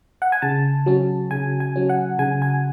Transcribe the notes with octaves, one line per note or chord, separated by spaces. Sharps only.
F#5
G#5
C#3 A5
F#3 C#4
C#3 G#5
G#5
F#3 C#4
F#5
C#3 G#5
G#5